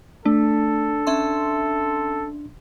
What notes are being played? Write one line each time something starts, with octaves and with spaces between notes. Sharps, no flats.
A3 D4 A4
C#4 E5 C6